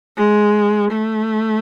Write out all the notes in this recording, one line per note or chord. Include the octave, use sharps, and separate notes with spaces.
G#3
A3